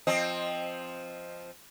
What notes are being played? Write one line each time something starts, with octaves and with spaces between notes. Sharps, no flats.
F3 C4 D#5